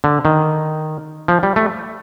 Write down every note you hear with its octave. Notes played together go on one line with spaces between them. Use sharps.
D3
D#3
F3
G3
A3